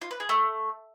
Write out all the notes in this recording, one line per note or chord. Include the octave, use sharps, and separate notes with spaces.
F4
B4
G#4
A3